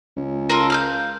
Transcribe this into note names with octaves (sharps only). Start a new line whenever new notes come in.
C#2
F4 A4 A#4
F5 F6 G6